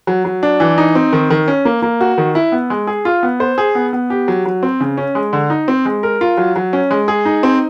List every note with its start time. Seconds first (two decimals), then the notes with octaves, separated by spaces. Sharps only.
0.07 F#3
0.25 F#3
0.43 D4
0.60 E3
0.78 D#4
0.95 C4
1.13 D#3
1.30 D#3
1.48 C#4
1.65 A#3
1.82 A#3
2.01 F#4
2.18 D#3
2.35 E4
2.52 B3
2.70 G#3
2.87 G#4
3.05 F4
3.23 B3
3.40 C5
3.58 G#4
3.75 B3
3.93 B3
4.10 G4
4.28 F#3
4.46 F#3
4.63 C4
4.80 C#3
4.97 C#4
5.15 G#3
5.33 D3
5.50 D#4
5.68 C4
5.85 G#3
6.03 A#4
6.21 F4
6.37 F#3
6.56 F#3
6.73 C#4
6.91 G#3
7.08 G#4
7.25 D#4
7.43 C4